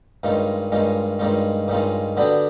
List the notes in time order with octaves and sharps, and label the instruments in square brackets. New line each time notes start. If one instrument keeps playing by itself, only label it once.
[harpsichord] G2 D#3 G#3 C#4 F4
G2 D#3 G#3 C#4 F4
G2 D#3 G#3 C#4 F4
G2 D#3 G#3 C#4 F4
D3 F#3 B3 D4 G4